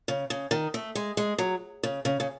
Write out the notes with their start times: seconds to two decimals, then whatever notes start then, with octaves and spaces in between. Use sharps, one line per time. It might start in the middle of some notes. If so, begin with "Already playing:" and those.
0.08 C#3
0.30 C#3
0.51 D#3
0.74 A3
0.95 G#3
1.17 G#3
1.38 F#3
1.83 C#3
2.05 C#3
2.20 C#3